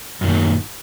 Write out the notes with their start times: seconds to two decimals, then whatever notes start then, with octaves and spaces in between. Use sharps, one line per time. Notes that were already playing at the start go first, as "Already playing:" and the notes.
0.21 F#2
0.24 D#3
0.27 A#2